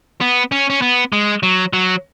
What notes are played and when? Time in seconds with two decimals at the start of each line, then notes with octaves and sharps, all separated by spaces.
0.21 B3
0.52 C#4
0.70 C#4
0.82 B3
1.13 G#3
1.43 F#3
1.73 F#3